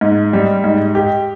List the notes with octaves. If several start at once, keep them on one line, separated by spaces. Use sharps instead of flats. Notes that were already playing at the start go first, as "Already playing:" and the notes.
G#2
G3
G#2
G4